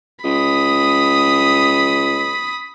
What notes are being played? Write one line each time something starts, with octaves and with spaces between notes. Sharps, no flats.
C#2 B5 D#6